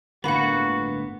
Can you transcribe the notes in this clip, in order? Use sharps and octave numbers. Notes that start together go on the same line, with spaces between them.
G1 A2 D3 A#3 B3 F#4 F#5 B5